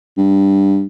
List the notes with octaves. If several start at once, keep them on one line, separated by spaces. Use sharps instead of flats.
G2